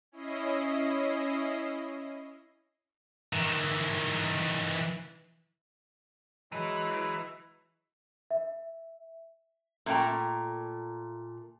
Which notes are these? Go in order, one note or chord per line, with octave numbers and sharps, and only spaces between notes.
C#4 E4 D#5 C7
D#3 E3
E3 F#3 G#3 E4
E5
A#2 A3 E4 G5 A#5